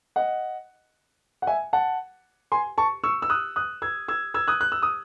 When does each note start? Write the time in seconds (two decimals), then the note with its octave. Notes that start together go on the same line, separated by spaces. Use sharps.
0.16 D#5 F#5
1.42 F#5
1.47 E5 G#5
1.73 F#5 A5
2.52 G#5 C6
2.78 A5 C#6
3.04 C#6 E6
3.22 E6
3.29 D#6 F#6
3.56 D#6 F#6
3.82 E6 G#6
4.08 E6 G#6
4.34 E6 G#6
4.47 D#6 F#6
4.61 F#6
4.72 E6
4.82 D#6